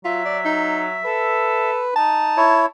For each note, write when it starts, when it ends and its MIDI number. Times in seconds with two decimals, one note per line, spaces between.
0.05 0.99 54
0.05 0.25 65
0.05 1.71 76
0.25 0.39 74
0.45 0.85 63
1.05 1.85 69
1.05 1.92 71
1.96 2.50 63
1.96 2.67 81
2.37 2.66 64
2.37 2.66 73